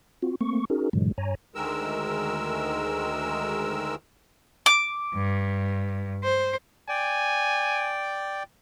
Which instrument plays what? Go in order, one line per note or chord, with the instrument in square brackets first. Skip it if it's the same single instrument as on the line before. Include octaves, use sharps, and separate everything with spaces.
[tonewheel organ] C4 F4 F#4
A3 A#3 C4 C#6
C#4 D#4 F#4 G#4 A#4
G2 A#2 D3 E3 F#3 G#3
G2 C#5 G#5 A#5
[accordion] D2 D#3 G#3 A#4 E6
[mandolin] D6
[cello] G2
C5
[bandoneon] D5 G5 [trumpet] G#5